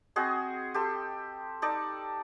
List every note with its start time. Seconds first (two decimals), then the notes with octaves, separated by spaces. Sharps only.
0.16 C4 F#4 G#4 D#5
0.74 G4 A4 C6
1.62 D#4 A4 D5